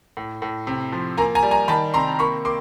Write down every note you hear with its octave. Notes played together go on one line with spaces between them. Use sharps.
A2
A2
C3
F3
A#3 G#5 A#5
G#5 A#5
G3
G#5 A#5
D#3 A5 B5
C3 A#5 C6
A#3 B5 C#6
A#3 C6 D6